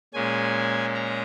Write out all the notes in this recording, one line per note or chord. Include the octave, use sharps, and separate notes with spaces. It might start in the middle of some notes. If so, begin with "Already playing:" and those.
A#2 G#3 C#4 G#5
A#5